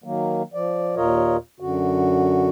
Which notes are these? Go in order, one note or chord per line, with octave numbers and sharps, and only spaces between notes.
D#3 F#3 A#3
F3 D5
D#2 A#2 F4 A#4 C#5 D#5
F#2 D3 F#4